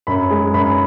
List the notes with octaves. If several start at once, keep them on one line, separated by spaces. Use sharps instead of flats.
F#2 B5
G#3
F#2 B5